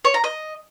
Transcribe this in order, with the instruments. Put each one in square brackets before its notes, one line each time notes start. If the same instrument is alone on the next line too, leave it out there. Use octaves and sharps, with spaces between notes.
[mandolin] C#5
A#5
D#5